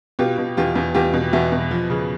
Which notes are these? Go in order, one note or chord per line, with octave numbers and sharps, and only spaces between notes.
B2 F4 G4
B2
E2 F4 G4
E2
E2 F4 G4
B2
E2 E4 F#4
B2
F3
C#3